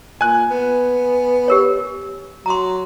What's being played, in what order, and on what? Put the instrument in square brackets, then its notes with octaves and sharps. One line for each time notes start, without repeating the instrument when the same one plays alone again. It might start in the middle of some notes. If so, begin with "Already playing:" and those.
[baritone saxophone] A#2 [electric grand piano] G#5 F#6
[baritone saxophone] B3
[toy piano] G4 A#4 C#5
[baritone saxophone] F#3 [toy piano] A#5 C6